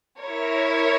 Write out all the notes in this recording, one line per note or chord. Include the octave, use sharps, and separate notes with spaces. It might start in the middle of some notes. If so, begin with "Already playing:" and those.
E4 A#4 C#5